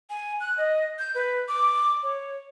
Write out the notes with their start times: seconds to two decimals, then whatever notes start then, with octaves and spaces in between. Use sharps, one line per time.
0.10 G#5
0.40 F#6
0.58 D#5
0.99 G6
1.15 B4
1.48 D6
2.03 C#5